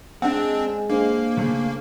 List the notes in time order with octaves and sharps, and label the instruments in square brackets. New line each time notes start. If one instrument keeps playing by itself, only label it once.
[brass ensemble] G#3 [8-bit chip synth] C4 D4 [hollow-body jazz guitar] F#5
[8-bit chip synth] A#3 [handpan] D4 C5
[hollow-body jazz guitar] C#3 A3 G#4